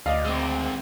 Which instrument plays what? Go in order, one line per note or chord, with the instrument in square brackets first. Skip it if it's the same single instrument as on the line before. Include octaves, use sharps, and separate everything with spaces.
[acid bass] D2 [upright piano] D5 D#5 F5
[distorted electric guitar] G#3 C4